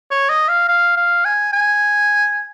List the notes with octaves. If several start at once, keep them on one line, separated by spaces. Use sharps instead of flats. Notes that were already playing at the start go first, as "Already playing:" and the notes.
C#5
D#5
F5
F5
F5
G#5
G#5